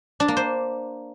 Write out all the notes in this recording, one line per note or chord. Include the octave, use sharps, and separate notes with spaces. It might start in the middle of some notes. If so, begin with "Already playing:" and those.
D4
A#3
C5